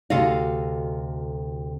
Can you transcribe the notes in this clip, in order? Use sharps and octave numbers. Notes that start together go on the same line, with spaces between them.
D2 C3 F#4 A4 D#5 F5